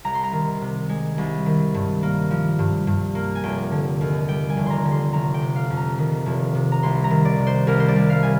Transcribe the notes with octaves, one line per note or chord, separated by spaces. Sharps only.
C2 A#5
C6
A#5
D#3
C3
G#3
C2
D#3
G2
A#3
F3
G2
G2
A#3
G#5
F1 G5
D3
D#2
G3 G5
G#5
F1
A#5 C6
D3
C6
F1 A#5
G5
C3
F5
F2
A#5
D#3
F1
C3
A#5
C2 C6
A#5
D#3
D5
C3
C5
C2 A#4
C5
D5
C2
F5
D#3 G#5